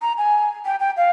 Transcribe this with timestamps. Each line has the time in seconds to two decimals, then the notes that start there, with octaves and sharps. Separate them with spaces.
0.02 A#5
0.18 G#5
0.66 G5
0.80 G5
0.97 F5